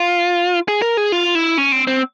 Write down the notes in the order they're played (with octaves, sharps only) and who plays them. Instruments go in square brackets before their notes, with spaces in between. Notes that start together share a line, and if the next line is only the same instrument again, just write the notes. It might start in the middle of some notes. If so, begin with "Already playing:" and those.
Already playing: [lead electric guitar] F4
G#4
A#4
G#4
F4
E4
C#4
C4
C4